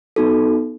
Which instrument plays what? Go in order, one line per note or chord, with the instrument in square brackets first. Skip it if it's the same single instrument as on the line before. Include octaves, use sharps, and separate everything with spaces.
[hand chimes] B3 D#4 F#4 A4